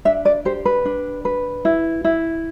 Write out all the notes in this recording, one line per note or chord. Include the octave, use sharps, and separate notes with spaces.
D4 E5
D5
G4 C5
B4
D4
B4
E4
E4